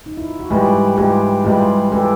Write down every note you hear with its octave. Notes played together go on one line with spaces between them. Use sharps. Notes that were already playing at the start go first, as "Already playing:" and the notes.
D#4
E4
F4
F#4
G#2 E3 G3 F4 G4
G#2 E3 G3 F4 G4
G#2 E3 G3 F4 G4
E3 G3 G4 A4